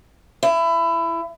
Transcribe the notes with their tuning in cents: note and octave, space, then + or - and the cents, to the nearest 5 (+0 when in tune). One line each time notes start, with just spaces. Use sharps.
E4 +20